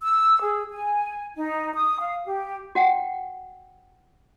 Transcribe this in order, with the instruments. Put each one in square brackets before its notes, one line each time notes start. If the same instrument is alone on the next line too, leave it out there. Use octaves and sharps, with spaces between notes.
[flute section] E6
G#4
G#5
D#4
D#6
F5
G4
[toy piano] F#4 F#5 G5